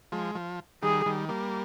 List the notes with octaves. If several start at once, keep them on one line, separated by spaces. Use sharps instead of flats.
F3 G#3
F3
D#3 G3 G#4
D#3 G3
G3 A#3